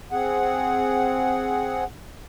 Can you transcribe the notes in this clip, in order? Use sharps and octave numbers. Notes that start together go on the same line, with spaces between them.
C4 G#4 F#5